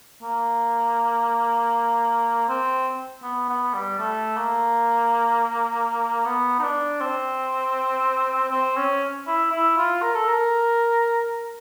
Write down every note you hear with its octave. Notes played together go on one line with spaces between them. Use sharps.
A#3
C4
B3
B3
G3
A3
A#3
B3
D#4
D4
C4
C4
C#4
E4
E4
F4
A#4
A4
A#4